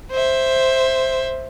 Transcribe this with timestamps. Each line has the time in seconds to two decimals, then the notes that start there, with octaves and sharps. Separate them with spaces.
0.11 C5 E5